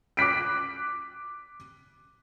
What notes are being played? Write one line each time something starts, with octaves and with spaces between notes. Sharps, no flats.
D6 F#6 B6 D7